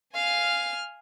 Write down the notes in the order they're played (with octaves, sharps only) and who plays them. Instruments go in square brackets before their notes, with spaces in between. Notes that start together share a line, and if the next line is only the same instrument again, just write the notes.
[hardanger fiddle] F5 [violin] G#5 F6